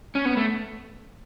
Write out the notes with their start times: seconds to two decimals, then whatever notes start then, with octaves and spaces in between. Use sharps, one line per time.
0.15 C#4
0.25 B3
0.37 A3